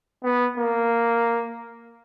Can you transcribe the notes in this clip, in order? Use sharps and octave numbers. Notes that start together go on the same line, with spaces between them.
B3
A#3